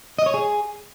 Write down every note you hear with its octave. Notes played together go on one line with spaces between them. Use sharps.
D#5
C#5
G#4